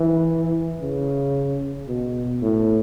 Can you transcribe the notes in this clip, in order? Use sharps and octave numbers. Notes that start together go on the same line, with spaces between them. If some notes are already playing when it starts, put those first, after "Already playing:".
Already playing: E3
C#3
B2
A2